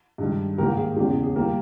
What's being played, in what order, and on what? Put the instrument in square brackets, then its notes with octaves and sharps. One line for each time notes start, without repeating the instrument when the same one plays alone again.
[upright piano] G2 D#3 G#3
G#2 D#3 A#3 G4 A#4
G#4
E2 C#3 G#3 G4
G#4
G#4
D#3 G3 A#3 G4 A#4